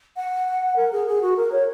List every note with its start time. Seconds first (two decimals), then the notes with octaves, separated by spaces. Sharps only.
0.17 F#5
0.76 A#4
0.92 G#4
1.07 G#4
1.22 F#4
1.37 A#4
1.52 C#5